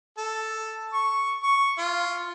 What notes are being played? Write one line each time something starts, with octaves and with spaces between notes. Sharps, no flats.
A4
C#6
C#6
F4